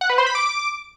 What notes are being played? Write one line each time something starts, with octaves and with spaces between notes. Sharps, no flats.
F#5
B4
C5
B5
D6